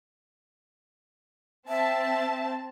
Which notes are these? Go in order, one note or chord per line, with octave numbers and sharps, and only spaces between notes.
C4 E5 A5